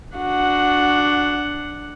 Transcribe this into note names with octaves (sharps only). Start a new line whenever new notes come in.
D4 F#4 F#5